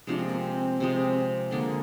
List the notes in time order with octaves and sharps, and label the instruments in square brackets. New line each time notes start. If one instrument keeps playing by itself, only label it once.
[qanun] C3 F3 G#3 [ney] D4
[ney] C4
A#3
C4
[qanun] C3 F3 G#3
[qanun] D3 G#3 D4 [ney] A#3